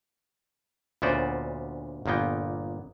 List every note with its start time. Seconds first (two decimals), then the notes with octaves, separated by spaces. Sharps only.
1.02 D2 A#2 B3 C#4 C5 D5
2.06 G1 A#2 A#3 B3 G5